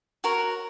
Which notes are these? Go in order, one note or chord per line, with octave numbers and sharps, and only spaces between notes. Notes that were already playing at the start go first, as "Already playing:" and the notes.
F#4 A#4 C#5